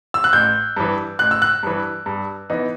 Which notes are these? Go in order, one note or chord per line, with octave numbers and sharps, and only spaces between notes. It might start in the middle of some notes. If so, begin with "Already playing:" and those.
E6
F#6
A1 G6
G2 E3
A1 F#6
E6
F#6
G2 E3
G2
E3 B3 D#4